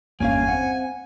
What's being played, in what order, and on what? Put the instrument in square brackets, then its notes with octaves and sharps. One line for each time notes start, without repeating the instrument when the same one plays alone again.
[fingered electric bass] G1 E2 [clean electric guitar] A#3 C#4 F5 [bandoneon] G#5
[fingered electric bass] C4 C#4 [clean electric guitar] F#5